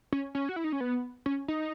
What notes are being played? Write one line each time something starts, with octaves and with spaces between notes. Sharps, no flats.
C#4
C#4
F#4
E4
D#4
C#4
B3
C#4
D#4